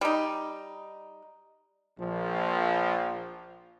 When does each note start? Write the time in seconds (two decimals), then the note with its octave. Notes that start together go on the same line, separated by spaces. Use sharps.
0.01 G3 D#4
1.99 A#1 F3